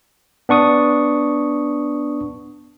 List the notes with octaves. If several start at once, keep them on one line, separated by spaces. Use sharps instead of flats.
B3 D4 C#6 D#6